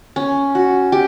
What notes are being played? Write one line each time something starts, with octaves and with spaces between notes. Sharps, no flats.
C#4
F#4
G4